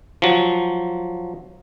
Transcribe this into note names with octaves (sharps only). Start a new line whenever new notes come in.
F3 F#3